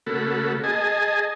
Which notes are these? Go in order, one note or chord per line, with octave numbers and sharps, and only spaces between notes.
C#3 A3 A#3 F#4 A4 B5
G#4 D#5 G#5 A5